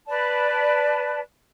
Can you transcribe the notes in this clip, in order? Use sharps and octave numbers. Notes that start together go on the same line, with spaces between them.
B4 D5 A5